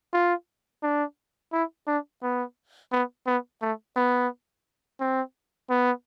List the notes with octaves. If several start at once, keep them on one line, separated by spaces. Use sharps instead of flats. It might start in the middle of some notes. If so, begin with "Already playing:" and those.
F4
D4
E4
D4
B3
B3
B3
A3
B3
C4
B3